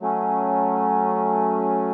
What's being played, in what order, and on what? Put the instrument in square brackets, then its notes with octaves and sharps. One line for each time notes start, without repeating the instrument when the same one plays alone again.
[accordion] F#3 A3 C#4